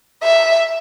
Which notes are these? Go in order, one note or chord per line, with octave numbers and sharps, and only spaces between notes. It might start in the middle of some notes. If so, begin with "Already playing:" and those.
E5